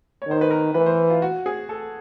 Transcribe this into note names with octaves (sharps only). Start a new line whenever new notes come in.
C#5
D#3 C5
B4
A#4
E3 B4
C5
F4
F#4
G#4
A4